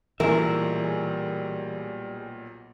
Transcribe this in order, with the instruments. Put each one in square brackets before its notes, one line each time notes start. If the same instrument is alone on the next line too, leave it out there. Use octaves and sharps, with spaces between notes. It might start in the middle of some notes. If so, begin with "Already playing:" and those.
[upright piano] B1 A#2 [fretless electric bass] E3 [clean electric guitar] G3 G#4 E5 [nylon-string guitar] A#4